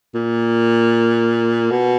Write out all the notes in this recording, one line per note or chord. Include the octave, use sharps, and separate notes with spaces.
A#2
B2